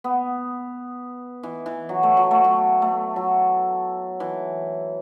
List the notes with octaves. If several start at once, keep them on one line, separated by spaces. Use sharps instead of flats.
B3
E3
E3
F#3
A3
F#3
A3
F#3
A3
F#3
E3